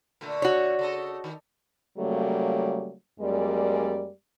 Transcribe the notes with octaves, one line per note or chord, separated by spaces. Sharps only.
A#2 D3 A3
F#4 C#5
C#3 A4 D#5
D#3
C#3 F#3 G3 A3 A#3
F#2 G3 G#3 A#3 D5